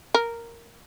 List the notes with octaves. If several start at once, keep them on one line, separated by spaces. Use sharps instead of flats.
A#4